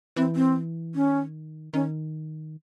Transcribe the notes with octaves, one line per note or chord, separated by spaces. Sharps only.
E3 C4
C4
D#3 C#4
D#3 C#4